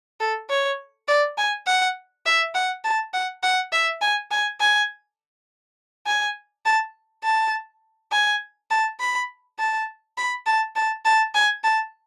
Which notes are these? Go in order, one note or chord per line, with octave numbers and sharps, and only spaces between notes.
A4
C#5
D5
G#5
F#5
E5
F#5
A5
F#5
F#5
E5
G#5
G#5
G#5
G#5
A5
A5
G#5
A5
B5
A5
B5
A5
A5
A5
G#5
A5